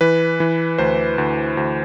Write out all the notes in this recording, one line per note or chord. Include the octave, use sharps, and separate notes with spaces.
E3 B4
E3
D2 C5
D2
D2